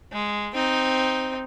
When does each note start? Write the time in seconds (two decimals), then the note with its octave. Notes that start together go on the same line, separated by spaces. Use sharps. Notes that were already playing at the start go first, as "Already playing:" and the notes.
0.12 G#3
0.55 C4 D#4